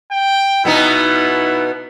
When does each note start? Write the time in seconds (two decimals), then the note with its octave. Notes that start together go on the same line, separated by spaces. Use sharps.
0.12 G5
0.65 B2 B3 D#4 E4